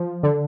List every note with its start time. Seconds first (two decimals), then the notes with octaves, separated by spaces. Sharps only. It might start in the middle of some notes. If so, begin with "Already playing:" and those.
Already playing: F3
0.23 D3